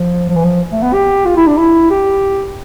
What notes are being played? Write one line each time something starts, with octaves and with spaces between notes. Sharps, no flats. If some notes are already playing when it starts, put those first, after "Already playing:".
Already playing: F3
F3
E3
F3
A3
B3
G4
F4
E4
D4
E4
G4